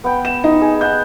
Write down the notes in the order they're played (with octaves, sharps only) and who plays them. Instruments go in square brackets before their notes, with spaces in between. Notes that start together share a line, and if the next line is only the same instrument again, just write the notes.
[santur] B3 G5
[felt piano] E7
D#4
[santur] G#4
[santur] D#5 F#5 [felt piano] G6